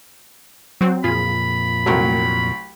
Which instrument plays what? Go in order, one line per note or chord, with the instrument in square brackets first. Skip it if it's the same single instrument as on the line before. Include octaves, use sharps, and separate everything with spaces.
[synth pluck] F#3 C4 F#4
[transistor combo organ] F2 A#2 [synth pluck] F4 G#4 [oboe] B5
[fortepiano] C2 F#3 [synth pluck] A3 A#4